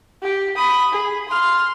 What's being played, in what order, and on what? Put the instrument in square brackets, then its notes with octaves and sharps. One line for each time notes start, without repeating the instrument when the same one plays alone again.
[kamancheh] G4
B5 D#6
G#4
C6 F6